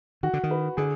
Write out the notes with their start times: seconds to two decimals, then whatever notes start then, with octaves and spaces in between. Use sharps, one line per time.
0.23 D#3 F#4
0.33 D3
0.43 D#3
0.51 B4
0.77 D3 G#4